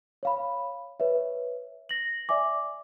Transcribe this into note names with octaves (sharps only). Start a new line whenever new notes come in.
C#5 F5 B5
B4 C#5 E5
A#6 F#7
D5 E5 G#5 D6